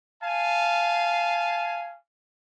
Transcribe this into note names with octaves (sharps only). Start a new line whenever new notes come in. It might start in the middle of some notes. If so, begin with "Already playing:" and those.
F5 G#5 A5